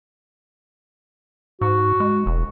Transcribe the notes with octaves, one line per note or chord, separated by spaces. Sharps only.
G#2 F#4
G#3
E1